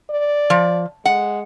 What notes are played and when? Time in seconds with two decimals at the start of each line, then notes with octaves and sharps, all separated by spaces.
0.10 D5
0.50 F3
1.05 G#3 F#5